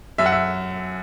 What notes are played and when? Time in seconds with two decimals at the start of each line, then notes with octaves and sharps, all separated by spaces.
0.18 F#2 E5
0.26 F#5
0.32 E5